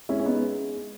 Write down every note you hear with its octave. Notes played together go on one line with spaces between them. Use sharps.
G#3 C#4 E4
C#4
B3 D#4
G#3